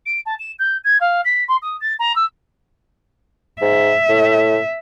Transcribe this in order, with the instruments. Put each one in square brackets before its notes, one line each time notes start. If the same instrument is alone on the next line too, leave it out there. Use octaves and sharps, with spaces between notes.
[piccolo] D7
A5
E7
G6
G#6
F5
B6
C6
D#6
A6
A#5
E6
[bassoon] G#2 [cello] E5
[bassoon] A2